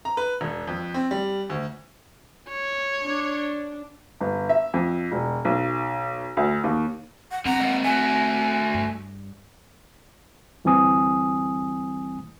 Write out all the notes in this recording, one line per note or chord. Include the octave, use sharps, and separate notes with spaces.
A#5
B4
E1
F2
C4
G3
D2
C#5
D4
G1
E5
F2
E1
B1
D2
D#2
F#5
D3 C4 F#5 A#5
G#3 A#3
A3 F#4 G#5
G2
D2 E3 G3 C4 G#5 D#6